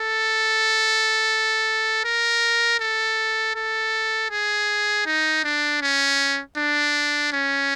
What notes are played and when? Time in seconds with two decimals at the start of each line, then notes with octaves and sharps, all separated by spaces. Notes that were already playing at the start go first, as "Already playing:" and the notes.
Already playing: A4
2.05 A#4
2.80 A4
3.55 A4
4.31 G#4
5.06 D#4
5.44 D4
5.82 C#4
6.57 D4
7.33 C#4